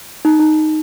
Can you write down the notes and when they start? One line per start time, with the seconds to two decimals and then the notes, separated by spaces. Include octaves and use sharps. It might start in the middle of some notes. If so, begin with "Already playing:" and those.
0.25 D#4
0.40 D#4